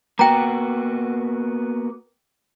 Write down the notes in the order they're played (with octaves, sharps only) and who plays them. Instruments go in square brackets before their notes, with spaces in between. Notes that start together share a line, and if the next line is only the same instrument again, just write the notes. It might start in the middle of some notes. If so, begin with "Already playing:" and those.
[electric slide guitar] A#3 B3 F#4 [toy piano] G5 A#5